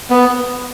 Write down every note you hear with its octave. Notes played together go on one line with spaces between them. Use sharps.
B3